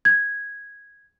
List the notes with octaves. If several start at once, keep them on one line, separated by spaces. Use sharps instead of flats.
G#6